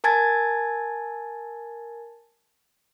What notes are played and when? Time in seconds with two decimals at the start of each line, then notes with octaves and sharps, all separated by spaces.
0.04 A#4 G#5 A5 G#6 A6